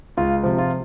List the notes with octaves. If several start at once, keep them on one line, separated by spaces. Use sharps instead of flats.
C#2 F4
C3 F3
F4